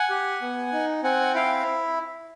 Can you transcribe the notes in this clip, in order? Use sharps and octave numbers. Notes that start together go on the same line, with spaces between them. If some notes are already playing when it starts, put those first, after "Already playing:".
Already playing: F#5 G#5
G4
B3
D#4
C4 F#5 G#5
E4 F5 G5